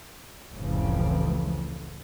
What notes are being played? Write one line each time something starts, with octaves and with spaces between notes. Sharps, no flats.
F1 C#2 A2 C#3 E3 F3